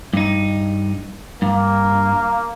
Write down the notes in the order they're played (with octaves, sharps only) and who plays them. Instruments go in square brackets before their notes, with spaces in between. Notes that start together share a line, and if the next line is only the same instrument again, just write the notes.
[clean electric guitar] G2 D#4
[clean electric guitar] G2 [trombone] A#3